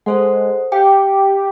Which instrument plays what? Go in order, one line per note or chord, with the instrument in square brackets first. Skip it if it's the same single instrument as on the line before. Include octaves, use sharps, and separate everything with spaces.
[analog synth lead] G#3 [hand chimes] A4 C5 F#5
[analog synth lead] G4 [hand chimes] F5 G5